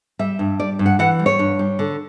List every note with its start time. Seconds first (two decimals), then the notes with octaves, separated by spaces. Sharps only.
0.19 G3 E5
0.39 G2
0.59 G3 D5
0.79 G2
0.86 F#5
0.99 E3 F#5
1.19 G3
1.26 C#5
1.39 G2
1.59 G3
1.79 D3